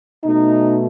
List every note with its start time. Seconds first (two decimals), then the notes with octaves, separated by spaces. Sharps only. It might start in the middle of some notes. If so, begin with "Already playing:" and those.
0.24 B2 A3 D#4